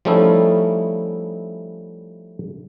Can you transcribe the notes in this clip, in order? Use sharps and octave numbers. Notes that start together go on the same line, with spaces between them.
F3 G3 A3 C#4 D#4 E4